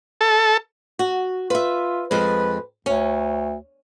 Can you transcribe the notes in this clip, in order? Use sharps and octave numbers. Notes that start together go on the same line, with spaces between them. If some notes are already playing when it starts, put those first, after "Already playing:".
A4
F#4
F4 B4 E5
F2 G#3 B4
D2 C#4